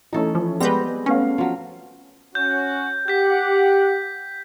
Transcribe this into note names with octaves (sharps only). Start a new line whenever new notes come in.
E3 A3 C#4 D#4 A4
F3
G3 G#3 B3 C4 G#4 B4 G6 A#6
A3 B3 C#4 F5
F3 F#3
C#4 F#4 G6
G4 F#5 G6 B6